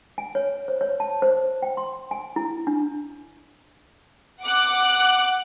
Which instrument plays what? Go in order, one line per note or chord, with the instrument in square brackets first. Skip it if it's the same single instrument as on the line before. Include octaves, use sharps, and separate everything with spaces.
[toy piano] G#5
C#5
C5
C#5
A5
C5
G5
C6
G#5
E4
D4
[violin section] F#5 D6 F#6